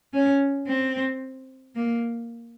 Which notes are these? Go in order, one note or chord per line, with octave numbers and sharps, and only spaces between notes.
C#4
C4
A#3